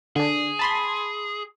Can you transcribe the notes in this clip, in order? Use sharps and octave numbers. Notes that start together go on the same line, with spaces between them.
D3 D4 G#4
A5 B5 C6